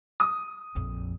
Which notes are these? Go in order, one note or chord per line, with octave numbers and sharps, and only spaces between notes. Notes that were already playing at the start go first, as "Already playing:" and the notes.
D#6
A#1 F2